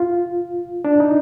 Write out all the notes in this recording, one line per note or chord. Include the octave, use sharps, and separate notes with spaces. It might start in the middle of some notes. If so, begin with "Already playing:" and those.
Already playing: F4
D4
D#4